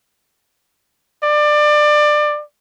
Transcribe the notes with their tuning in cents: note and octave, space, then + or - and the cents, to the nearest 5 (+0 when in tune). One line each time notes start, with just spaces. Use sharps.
D5 +25